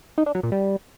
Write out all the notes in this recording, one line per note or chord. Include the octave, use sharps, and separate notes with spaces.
D#4
D4
F#3
A#2
G3